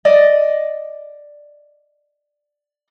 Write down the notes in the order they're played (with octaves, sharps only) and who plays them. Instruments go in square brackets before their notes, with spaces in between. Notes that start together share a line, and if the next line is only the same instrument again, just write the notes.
[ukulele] D5 D#5